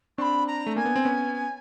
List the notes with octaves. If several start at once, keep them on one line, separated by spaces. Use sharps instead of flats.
C4 D4 B5 C#6
A#5
A3
A#3 G#5
B3
C4
B3 C#4